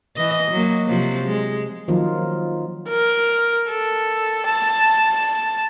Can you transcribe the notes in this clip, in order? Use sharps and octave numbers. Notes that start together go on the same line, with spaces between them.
E3 D#5
F#3 A#3
C3 F3 F#3
G#3
D#3 F3 F#3 A#3 D#4 F4
A#4
A4
A5